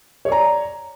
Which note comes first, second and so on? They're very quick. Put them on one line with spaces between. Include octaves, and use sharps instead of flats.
C#5 D5 A#5